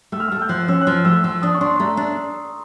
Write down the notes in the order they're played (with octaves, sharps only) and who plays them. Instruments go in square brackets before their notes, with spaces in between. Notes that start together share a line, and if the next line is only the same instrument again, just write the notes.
[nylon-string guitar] A3 [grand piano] E6
[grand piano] F6
[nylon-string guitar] A3 [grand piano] E6
[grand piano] G6
[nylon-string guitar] F3 [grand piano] F#6
[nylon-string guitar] C#4 [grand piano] E6
[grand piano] F#6
[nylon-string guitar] F3 [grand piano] F6
[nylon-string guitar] A3 [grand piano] E6
[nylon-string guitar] F3 [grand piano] E6
[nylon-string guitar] D4 [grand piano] D#6
[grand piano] C#6
[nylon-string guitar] D4 [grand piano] C6
[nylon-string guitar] A3 [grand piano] A#5
[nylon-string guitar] D4